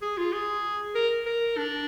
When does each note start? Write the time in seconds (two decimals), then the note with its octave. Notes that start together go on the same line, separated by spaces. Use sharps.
0.02 G#4
0.17 F4
0.32 G#4
0.95 A#4
1.26 A#4
1.57 D4